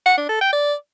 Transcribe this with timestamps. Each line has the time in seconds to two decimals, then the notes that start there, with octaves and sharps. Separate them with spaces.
0.06 F#5
0.18 D4
0.29 A4
0.41 G5
0.53 D5